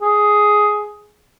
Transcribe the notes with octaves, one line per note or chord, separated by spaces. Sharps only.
G#4